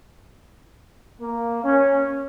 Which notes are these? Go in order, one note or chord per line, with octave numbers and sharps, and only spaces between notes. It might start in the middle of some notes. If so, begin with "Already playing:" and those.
A#3
C#4